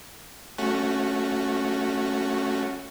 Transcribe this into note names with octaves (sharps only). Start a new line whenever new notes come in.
A3 C#4 F#4